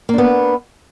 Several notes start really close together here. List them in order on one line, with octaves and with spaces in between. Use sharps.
A#3 D4 B3